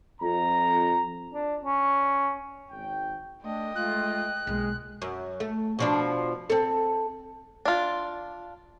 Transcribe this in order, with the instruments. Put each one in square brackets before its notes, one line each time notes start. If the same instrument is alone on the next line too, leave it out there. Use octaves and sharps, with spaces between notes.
[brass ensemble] F2 A#5
[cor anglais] D4
C#4
[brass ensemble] G#1 G5
[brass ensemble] A3 D4 [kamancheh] D#5 G5
[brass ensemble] G#3 A3 F4 [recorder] F#6
[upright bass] B1 A#3 [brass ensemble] G#3
[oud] F#2
A3
B2 F3 D4
C4 A4
[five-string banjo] D4 F4